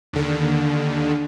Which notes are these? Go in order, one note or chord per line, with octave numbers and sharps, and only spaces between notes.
D#2 D3